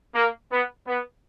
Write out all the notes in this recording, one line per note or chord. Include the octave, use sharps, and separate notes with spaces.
A#3
B3
B3